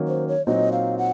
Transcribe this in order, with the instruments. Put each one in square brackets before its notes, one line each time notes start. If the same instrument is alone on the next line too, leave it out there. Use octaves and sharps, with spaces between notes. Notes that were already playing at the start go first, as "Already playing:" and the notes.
Already playing: [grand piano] D#3 F#3 A#3 C#4
[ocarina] C5
C#5
[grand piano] A#2 F#3 C4 D#4 [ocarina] D#5
[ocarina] F5
F#5